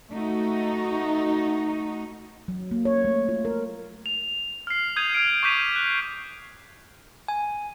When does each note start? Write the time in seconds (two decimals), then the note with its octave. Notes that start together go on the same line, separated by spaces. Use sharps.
0.11 A3 D#4 F#4
2.48 F#3
2.71 A#3
2.85 C#5
3.05 A3
3.29 F4
3.45 A#4
4.06 F7
4.67 F6 C7
4.96 D#6 G6 G#6 D#7 F7
5.14 F6 D7
5.43 C#6 D6 G6 B6 D#7 F7
5.76 F#6
7.28 G#5